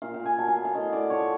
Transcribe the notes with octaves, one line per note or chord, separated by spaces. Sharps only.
A#2 F5
G5
A#2
G#5
F#3 A5
G#5
B3
F5
A2 D#5
A2 D5
F3 C#5